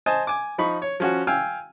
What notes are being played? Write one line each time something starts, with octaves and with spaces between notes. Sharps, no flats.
C5 D#5 G#5 A5
G#5 D6
F3 D#4 B5 C#6
C#5
F3 C#4 F#4
F5 G5 G#5 E6 F6